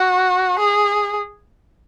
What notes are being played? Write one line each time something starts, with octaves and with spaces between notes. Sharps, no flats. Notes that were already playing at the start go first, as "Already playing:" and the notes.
Already playing: F#4
G#4